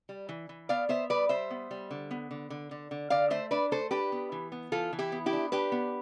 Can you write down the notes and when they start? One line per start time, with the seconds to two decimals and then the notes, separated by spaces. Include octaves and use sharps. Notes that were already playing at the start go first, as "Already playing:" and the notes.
0.09 G3
0.29 E3
0.49 E3
0.69 B3 D5 F5
0.89 B3 C5 E5
1.10 G3 B4 D5
1.29 G3 C5 E5
1.51 B3
1.71 G3
1.91 D3
2.11 B3
2.31 D3
2.50 D3
2.71 D3
2.91 D3
3.10 D3 D5 F5
3.30 A3 C5 E5
3.51 D4 B4 D5
3.71 A3 A4 C5
3.91 D4 G4 B4
4.12 B3
4.32 E3
4.52 B3
4.72 E3 F4 A4
4.93 E3
4.99 E4 G4
5.12 B3
5.26 E4 G4
5.33 D4
5.52 D4 G4 B4
5.72 B3